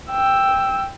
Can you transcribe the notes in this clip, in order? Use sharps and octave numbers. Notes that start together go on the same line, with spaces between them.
G5 E6